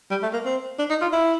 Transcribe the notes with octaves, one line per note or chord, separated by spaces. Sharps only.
G3
A3
A#3
C4
D4
D#4
F4
E4